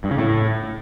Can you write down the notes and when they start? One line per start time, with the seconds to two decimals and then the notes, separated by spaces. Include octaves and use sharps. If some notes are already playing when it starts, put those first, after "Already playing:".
0.04 G2
0.11 C#3
0.18 A2